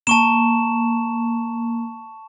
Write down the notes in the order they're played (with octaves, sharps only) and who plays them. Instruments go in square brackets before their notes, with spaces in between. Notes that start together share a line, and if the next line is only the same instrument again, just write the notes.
[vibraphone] A#3 [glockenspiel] A5 C#6 E7